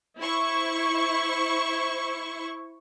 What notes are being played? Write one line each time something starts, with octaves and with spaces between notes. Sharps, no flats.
E4 C5 C#6